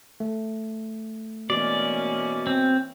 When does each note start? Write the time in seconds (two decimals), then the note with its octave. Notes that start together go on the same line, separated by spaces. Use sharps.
0.20 A3
1.50 B2 E3 A#3 C#4 D5
2.47 C4